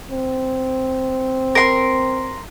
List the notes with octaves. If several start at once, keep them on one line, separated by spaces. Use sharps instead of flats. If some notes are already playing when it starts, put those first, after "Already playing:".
C4
A#4 C6